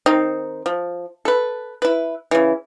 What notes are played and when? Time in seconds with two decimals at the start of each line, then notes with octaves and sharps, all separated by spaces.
0.06 D#3 C4 D#4
0.66 F3
1.25 A4 B4
1.82 E4 B4
2.31 C#3 E3